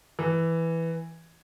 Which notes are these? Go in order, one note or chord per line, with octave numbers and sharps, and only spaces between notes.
E3